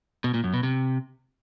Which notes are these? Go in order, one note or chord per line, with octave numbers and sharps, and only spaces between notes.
B2
A#2
F#2
B2
C3